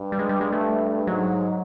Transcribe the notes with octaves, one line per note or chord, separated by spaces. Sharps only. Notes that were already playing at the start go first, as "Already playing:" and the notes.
Already playing: G2
G3
G#3
G3
G#3
A3
G#2 F#3